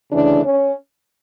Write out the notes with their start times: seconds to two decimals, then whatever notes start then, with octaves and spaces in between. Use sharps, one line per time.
0.12 D2 C#3 E3 D4
0.44 C#4